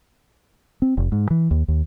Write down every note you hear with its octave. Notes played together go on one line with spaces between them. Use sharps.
C4
F1
G#2
E3
D#2
D#2